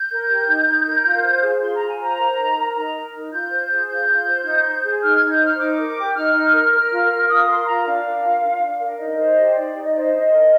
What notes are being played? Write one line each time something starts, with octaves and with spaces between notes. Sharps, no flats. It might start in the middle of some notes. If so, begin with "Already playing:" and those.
Already playing: G6
A#4
G4
D#4
D#4
A#4
F4
C5
G#4
F4 C6
A#5
F4
G#5
C5 A#5
A#4
D#4
A#4
D#4 A#5
A#4
D#4
F4 G6
C5
G#4
F4 G6
F4
C5
D#4
C5
G#4
D#4 F6
G#6
D#4
G6
C5 F6
D#4 D6
A#4
G4
D#4 F6
D#4
A#4
A#4 F6
F4
A#4
F4 D#6
A#4 C6
F4 A#5
D4 F5
A#4
F4
D4
D4
A#4
D#4 D#5
C5
G4
D#4 D5
D#4
D#5
C5 D5
D#5
D4 D#5
A#4